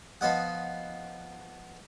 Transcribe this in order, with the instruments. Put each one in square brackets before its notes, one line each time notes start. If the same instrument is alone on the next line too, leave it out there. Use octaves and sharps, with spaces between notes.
[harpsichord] F3 B3 D#5 F#5